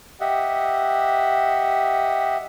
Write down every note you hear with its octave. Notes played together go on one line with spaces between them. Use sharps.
G4 D#5 E5 F#5